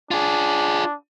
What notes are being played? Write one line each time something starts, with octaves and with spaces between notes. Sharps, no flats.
D4 F4 G#4